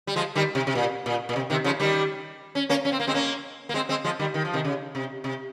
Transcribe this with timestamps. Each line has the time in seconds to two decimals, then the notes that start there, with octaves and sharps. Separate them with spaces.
0.07 G3
0.16 F3 G#3
0.35 D#3 G3
0.55 C3
0.67 C3
0.75 A#2
1.06 A#2
1.29 A#2
1.36 C3
1.50 C3 D#3
1.64 C#3 F3
1.80 D#3 G3
2.55 C#4
2.69 A#3 C#4
2.85 C#4
2.92 C4
3.00 A#3
3.07 G#3 C4
3.14 A#3 C#4
3.69 A#3
3.74 G#3 C4
3.89 G#3 C4
4.04 F3 G#3
4.19 D#3 G3
4.34 D#3
4.45 F3
4.54 C3 D#3
4.65 C#3
4.95 C3
5.24 C3